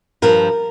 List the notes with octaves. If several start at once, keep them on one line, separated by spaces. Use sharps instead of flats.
G2 F3 A#4